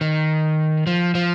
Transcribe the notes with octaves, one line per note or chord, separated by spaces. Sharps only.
D#3
F3
F3